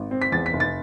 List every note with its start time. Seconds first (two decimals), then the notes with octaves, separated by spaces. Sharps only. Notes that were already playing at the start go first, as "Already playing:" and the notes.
Already playing: G#1
0.11 C4
0.22 B6
0.32 E2 A6
0.46 B6
0.53 F1
0.60 A6